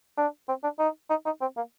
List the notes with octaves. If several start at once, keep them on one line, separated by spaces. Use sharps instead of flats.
D4
C4
D4
D#4
D#4
D#4
C4
A#3